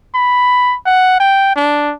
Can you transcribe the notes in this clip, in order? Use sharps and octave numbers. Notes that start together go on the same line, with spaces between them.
B5
F#5
G5
D4